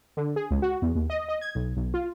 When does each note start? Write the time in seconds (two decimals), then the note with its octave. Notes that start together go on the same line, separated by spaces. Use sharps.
0.17 D3
0.36 G#4
0.51 C#2
0.62 F#4
0.82 E2
0.95 D#2
1.10 D#5
1.29 D#5
1.41 G#6
1.55 B1
1.77 B1
1.94 F4